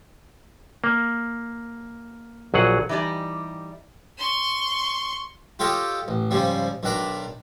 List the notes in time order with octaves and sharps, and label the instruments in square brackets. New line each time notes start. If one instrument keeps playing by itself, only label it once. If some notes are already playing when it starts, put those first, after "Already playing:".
[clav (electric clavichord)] A#3
A#1 F#3 G#4 F#5
[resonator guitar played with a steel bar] E3 G3 D#4 G4 D5
[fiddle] C6 C#6
[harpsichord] F4 G4 A4 C#5 D#5
A1
G#2 C#3 F3 G3
B1 D#3 D4 A#5 B5